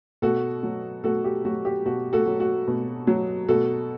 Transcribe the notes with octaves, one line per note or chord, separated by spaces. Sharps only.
B2 F#4 A4
F#3
B2 F#4 A4
G4
F#3 F#4
G4
B2 F#4
F#4 A4
F#3
F#4
B2
F#3
B2 F#4 A4